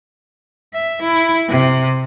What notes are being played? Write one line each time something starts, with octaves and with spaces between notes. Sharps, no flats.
E5
E4
C3